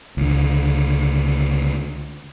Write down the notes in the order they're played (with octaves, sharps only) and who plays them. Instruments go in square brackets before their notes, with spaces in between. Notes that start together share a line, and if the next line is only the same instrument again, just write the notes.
[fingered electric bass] C#2 D3